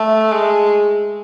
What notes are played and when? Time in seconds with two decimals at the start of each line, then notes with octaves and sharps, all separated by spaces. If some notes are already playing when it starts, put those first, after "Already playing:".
Already playing: A3
0.32 G#3